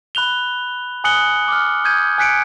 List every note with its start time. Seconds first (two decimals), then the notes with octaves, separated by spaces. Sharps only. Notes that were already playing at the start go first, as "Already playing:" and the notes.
0.15 B5 F#6 F7 G7
1.04 G#5 D#6 F#6 C#7 F#7 G7
1.48 D6 F6
1.84 D#6 G6 G#6 D#7
2.18 G#5 F#6 B6 C#7 D7